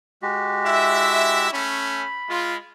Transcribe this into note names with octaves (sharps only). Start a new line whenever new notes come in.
G#3 F#4 G4
E4 E5
A3 C#4 B5
G#3 F4